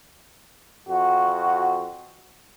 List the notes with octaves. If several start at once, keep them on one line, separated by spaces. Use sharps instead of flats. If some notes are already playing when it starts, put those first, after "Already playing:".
F2 F#4